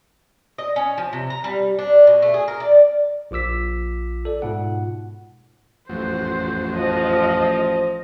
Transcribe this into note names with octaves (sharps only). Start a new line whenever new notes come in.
D#5
C#4
F3
C3
A#5
G3
D4
B2
A3
G#4
A#4
D5
A#1 F4 D6 E6 B6
A4 D5
G#2 B2 F4 F#5
A1 F2 F#3 C5
F3 D#5